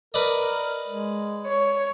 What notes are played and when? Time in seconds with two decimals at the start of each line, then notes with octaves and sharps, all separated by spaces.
0.14 A#4 B4 D5 D#5
0.88 G#3
1.47 C#5